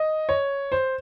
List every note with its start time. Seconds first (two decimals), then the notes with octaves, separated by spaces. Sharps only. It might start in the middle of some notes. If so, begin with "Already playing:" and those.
Already playing: D#5
0.29 C#5
0.72 C5